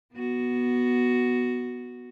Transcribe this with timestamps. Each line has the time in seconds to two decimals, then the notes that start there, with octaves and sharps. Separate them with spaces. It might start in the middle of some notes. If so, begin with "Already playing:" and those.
0.13 B3 F#4